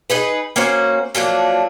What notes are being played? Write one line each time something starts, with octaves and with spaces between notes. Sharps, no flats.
D#4 G#4 B4
A#3 C#4 F#4 C5
F3 F#3 A#3 D4